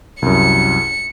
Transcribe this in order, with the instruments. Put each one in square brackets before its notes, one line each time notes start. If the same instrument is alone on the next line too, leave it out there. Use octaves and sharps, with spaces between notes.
[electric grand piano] C2 F#2 [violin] C#7